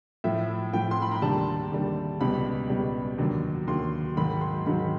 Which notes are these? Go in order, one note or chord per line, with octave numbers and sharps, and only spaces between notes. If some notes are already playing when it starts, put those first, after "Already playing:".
A2 F3 E5
A2 F3 G5
C6
B5
A#5
D#2 D3 G3 A5
D#2 D3 G3
C#2 B2 G3 B5
C#2 B2 G3
D#2 D3 F#3
D#2 D3 F#3 C6
G#2 D#3 F#3 B5
C6
G#2 D#3 F#3 B5